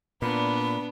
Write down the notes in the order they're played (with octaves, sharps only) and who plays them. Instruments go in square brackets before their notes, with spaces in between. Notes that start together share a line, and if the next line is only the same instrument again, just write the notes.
[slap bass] A#2 [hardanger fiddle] B3 D4 [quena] B5